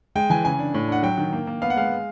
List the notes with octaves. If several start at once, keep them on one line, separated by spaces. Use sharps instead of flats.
G#3 G5
E3 G#5
C#3 G#5
D4
A2
D4 F#5
F#3 G5
D#3
A#3
A#3
B3 F5
F#5
G#3 F5